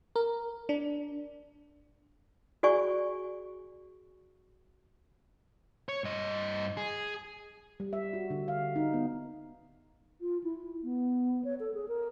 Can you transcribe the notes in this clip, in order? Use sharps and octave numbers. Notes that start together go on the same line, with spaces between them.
A#4
D4
F#4 G#4 D5 G#5 C#6
C#5
G2 D#5
G#4
G3
E5
F#4
D3
F5
D#4
B3
F4
E4
B3
C#5
A4
G#4
A#4